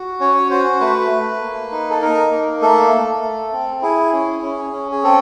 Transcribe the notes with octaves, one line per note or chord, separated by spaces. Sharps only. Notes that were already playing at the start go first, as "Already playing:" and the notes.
Already playing: F#4
C#4 C#5
F#4 C5
A3 B4
A3
A#3
D#4
A4
D#4 A#4
A#3
A3 A4
A3
A3
C4
E4 G#4
C#4
C#4
C#4
G#4
C4 A4